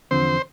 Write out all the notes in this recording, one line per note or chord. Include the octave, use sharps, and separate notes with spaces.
E2 D3 F3 C4 C5